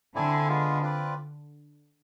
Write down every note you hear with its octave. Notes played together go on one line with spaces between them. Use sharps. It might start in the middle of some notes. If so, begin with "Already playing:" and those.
D3 C4 E4 A4 D5 G#5
G#3 B3 F4
C4 F4 B4 D5